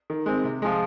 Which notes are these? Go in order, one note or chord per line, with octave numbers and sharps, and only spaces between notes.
D#3
G#3 C4
C3
F3 G#3